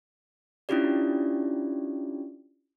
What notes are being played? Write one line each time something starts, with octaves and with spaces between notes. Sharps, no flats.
C#4 D4 E4 F4 G4 D5